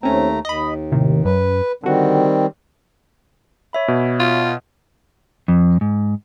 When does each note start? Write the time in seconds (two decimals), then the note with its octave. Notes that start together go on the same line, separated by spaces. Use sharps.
0.03 D#2 A3 C4 C#4 A#5
0.45 D#2 D#5 B5
0.92 A2 C3 D#3
1.25 F#2 B4
1.84 D3 D#3 G3 C4 F#4
3.73 C#5 E5 B5
3.88 B2
4.19 F4
5.48 F2
5.81 G#2